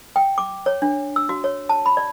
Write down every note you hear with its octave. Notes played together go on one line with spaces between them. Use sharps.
G5
D6
C#5
D4
E6
F#4
C#5
A5
B5
D5